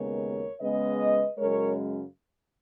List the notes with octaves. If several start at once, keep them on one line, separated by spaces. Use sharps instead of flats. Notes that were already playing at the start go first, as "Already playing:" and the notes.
Already playing: D#2 C#3 G#3 B3 A#4 C#5
C#3 G#3 B3 B4 D#5
F#2 C#3 G#3 A#4 C#5